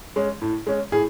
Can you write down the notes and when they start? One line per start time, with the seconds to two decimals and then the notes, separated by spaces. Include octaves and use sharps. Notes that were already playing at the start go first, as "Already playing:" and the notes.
0.16 G#3 C#4
0.42 A2
0.67 G#3 C#4
0.92 A2 G#4